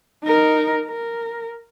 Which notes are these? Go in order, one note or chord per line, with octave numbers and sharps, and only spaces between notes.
D#4 A#4
A#4